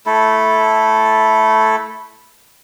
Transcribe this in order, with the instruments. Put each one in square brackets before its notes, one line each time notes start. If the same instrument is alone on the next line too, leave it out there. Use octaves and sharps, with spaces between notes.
[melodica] A3 E4 A4